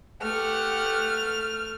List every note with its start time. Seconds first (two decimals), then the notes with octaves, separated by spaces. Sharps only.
0.21 A3 G4 F#5 F6